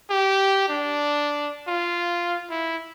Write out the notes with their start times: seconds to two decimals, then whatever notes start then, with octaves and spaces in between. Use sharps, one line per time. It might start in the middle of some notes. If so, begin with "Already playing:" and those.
0.10 G4
0.69 D4
1.68 F4
2.50 E4